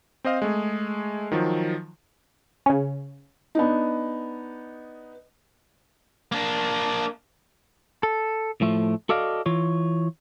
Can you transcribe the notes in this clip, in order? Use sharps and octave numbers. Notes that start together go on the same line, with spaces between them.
C4 C5 D#5 F5
G#3 A3 G#4
D#3 F3 F#3
C#3 C#4
B3 D4 D#4
A#3 D4
A4
A2 F3 A3
F#4 A4 D5 D#5 F5
E3 F4 C#5